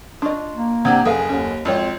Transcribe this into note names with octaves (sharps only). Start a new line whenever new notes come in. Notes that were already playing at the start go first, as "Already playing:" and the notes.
D4 F4 D#5 C6 C#6
A#3
C3 C4 D4 G4 F#5 D#6 G#6
F#1 G#4 A4 B4 F5 G#5
D#2 C#4 F#5
G#1 F2 F3 F4 C#5 G5 E6